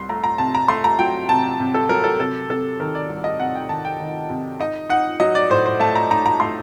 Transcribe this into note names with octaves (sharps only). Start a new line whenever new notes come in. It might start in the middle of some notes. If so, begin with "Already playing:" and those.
Already playing: C2 C6
A3 A#5
A#5
C3 A5
A#5
A3 C6
A#5
F#3 G5
C3 A5
C3
A4
F#3 A#4
A4
C3 A4
C3 A4
D#3 A#4
D5
C2
D#5
C3 F#5
G5
D#3 A5
G5
D#3
C3
D#4 D#5
D#4 F#5
F#3 D#5
D5
A2 C5
C5
A3 A5
A#5
D#4 A#5
A#5
A3 C6